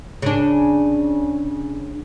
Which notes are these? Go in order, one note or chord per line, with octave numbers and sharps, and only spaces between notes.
C#3 D4